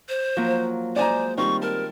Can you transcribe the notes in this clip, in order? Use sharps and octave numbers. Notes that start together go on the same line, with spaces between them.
C5
F3 F#3 A#3
G#3 C5 D5 G#5 A#5
D#3 G3 C4 F4 C#6
A#4 A5